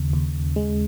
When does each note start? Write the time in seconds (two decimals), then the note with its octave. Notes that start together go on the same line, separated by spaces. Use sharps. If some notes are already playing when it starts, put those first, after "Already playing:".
Already playing: D#2 C#3
0.13 D#2
0.56 G#3